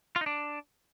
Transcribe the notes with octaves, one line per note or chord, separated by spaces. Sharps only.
F4
D#4
D4